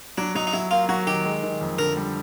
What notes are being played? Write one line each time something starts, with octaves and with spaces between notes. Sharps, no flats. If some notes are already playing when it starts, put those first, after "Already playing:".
F#3 D4
F#3 D#4
D#4
F#3 E4
A#3 F4
F#3 F#4
D#3 G4
G#3
D#3
F2
D3 A#4
G3